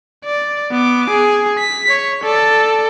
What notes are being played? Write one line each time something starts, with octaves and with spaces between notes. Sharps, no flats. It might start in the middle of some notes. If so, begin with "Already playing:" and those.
D5
B3 D6
G#4
B6
C#5
A4 D5